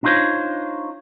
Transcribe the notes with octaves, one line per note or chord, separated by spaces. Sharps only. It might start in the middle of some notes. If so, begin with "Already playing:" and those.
D4 D#4 F4 F#4 C5 C#5